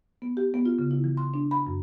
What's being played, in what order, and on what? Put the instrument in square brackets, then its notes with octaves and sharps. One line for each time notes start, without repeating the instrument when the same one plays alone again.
[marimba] B3
G4
B3
F4
C#3
E4
E3
C6
D4
B5
F#2